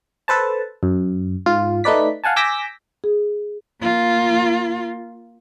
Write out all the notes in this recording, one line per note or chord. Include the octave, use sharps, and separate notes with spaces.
A4 B4 C5 A5
F#2
G#2 F4
A3 D#4 B4 D5 B6
F5 F#5 G#5 A5
G#5 D6 E6 G6 A#6 B6
G#4
A#3 F4